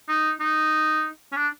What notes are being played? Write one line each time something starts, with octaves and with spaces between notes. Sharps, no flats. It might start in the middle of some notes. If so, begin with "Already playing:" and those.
D#4
D#4
C#4
D4